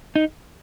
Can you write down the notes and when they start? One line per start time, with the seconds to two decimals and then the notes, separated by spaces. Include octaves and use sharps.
0.16 D#4